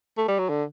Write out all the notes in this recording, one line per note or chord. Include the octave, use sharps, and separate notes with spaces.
A3
G3
F#3
D3